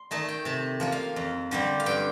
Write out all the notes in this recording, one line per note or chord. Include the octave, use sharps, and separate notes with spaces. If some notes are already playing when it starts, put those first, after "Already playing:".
Already playing: C6
D#3 A3 D#4 A5
G5
C3 A5
F3 A#3 F4
F5
F2
D3 G3 C4
F5
G2 G5